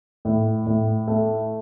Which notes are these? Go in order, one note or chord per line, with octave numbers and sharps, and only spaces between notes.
A2
A2
A3